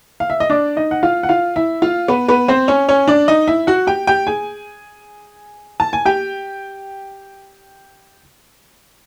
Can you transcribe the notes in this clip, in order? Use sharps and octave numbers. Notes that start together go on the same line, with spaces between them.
F5
E5
D#5
D4 D5
D#4 D#5
F#5
F4 F5
F#5
F4 F5
E4 E5
F4 F5
B3 B4
B3 B4
C4 C5
C#4 C#5
C#4 C#5
D4 D5
D#4 D#5
E4 E5
F#4 F#5
G4 G5
G4 G5
G#4 G#5
A5
G#5
G4 G5